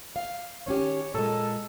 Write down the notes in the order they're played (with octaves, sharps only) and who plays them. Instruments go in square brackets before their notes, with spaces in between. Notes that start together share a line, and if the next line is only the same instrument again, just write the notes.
[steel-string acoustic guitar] F5
[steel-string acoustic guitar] D#3 C#4 G4 [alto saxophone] C#5
[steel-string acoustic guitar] A#2 G#3 [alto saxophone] A4